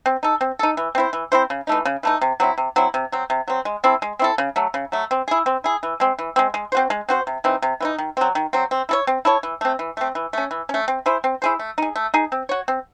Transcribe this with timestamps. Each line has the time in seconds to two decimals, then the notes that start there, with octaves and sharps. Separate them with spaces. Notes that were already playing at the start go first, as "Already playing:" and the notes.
0.06 C4
0.23 D#4 A4
0.41 C4
0.59 D#4 A4
0.77 E3
0.95 C4 E4 C5
1.13 E3
1.32 C4 E4 C5
1.50 C#3
1.67 E3 A3 D#4
1.85 C#3
2.03 E3 A3 D#4
2.21 C3
2.40 F#3 C4 E4
2.58 C3
2.76 F#3 C4 E4
2.94 C3
3.12 F#3 C4
3.30 C3
3.48 F#3 C4
3.65 G#3
3.84 C4 E4 A4
4.02 G#3
4.19 C4 E4 A4
4.38 C#3
4.56 F#3 A3
4.74 C#3
4.92 F#3 A3
5.11 C4
5.28 E4 G#4
5.46 C4
5.64 E4 G#4
5.83 E3
6.00 G#3 C4
6.19 E3
6.36 G#3 C4
6.54 G#3
6.72 C4 F#4 C5
6.90 G#3
7.09 C4 F#4 C5
7.27 C3
7.44 E3 C4 D#4
7.62 C3
7.80 E3 C4 D#4
7.98 D#3
8.17 F#3 C4
8.35 D#3
8.53 F#3 C4
8.71 C4
8.89 E4 A4 C#5
9.07 C4
9.25 E4 A4 C#5
9.43 E3
9.61 A3 C4
9.79 E3
9.97 A3 C4
10.15 E3
10.33 A3 C#4
10.51 E3
10.69 A3 C#4
10.88 C4
11.06 E4 G#4 C5
11.24 C4
11.42 E4 G#4 C5
11.59 A3
11.78 D#4 G#4
11.96 A3
12.14 D#4 G#4
12.32 C4
12.49 F#4 C#5
12.68 C4